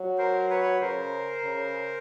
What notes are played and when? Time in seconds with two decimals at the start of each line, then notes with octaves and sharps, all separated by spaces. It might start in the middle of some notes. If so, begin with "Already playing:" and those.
Already playing: F#3
0.18 A#4 C5
0.50 B4 C#5
0.81 C#3 A#4 C5
1.44 C#3